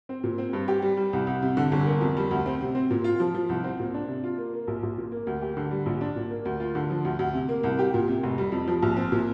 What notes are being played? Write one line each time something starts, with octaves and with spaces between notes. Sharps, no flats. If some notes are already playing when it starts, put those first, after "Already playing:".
C4
A#2
C4
G2
G4
G3
G3
C2
C2
C3
D3
G1
A#3
F2
G3
D2
C4
C3
C4
A#2
F4
F3
F3
C2
C4
A#2
D4
C3
F4
A#3
A#3
A#1
A#1
A#2
A#3
D2
G4
D3
G3
A#1
D4
A#2
A#3
D2
F4
D3
F3
D2
D2
C3
A#3
C2
G4
A#2
C3
F1
G3
F2
F3
A#1
C4
A#2